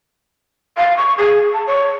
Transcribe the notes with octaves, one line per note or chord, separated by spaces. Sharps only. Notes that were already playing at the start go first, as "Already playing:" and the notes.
F5
C#6
G#4
A5
C#5